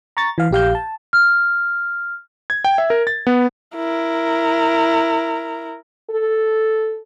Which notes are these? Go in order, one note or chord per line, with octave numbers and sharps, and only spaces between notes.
A#5 C#6 A6
E3 F5
A#1 G4 F5 G6
A5
F6
G#6
G5
E5
A#4
A6
B3
E4 A#4
A4